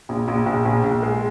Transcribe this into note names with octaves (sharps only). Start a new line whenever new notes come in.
A#1
A#1
A#1
A#1
A#1
G#3